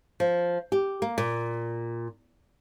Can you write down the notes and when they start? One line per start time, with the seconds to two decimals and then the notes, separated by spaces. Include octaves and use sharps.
0.20 F3
0.72 G4
1.02 A#3
1.18 A#2